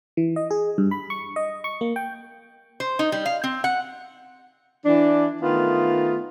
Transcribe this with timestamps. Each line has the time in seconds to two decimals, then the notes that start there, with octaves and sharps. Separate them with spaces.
0.17 E3
0.36 D#5
0.51 G#4
0.78 G2
0.91 B5
1.10 C#6
1.36 D#5
1.64 C#6
1.81 A#3
1.96 G5
2.80 C5
2.99 D#4
3.12 G3
3.26 F5
3.44 C4
3.64 F#5
4.85 E3 D4
5.42 D#3 A3 B3 F4